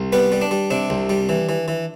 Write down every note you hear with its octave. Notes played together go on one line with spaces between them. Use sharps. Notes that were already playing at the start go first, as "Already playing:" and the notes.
Already playing: C2
G3 B3 B4
G3
D4
G3
C3 D4
C2
G3
E3
E3
E3